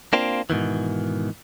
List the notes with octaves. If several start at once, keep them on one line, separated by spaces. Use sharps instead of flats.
A#3 C4 D4 F4
G#2 B2 D#3 E3